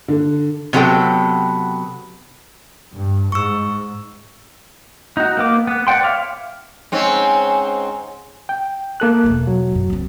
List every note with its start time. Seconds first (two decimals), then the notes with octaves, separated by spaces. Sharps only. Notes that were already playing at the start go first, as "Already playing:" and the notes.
0.08 D3
0.73 C3 F#3 B3 A4 G5
2.95 G2
3.32 G#2 C#6 E6
5.17 D#4 F#4
5.37 A#3 B3 D6
5.67 B3
5.87 B4 D5 F#5 G5 C6
6.03 C#5 E5 F5 D6
6.92 G#2 C4 C#4
8.49 G5
9.00 A#3 A4 F#6
9.24 E1 A3
9.47 F#3
9.72 F#2 A#2
9.90 C2 C4